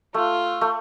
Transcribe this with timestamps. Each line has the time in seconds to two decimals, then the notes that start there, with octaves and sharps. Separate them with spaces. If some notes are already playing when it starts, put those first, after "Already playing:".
0.14 A3 F4
0.61 A3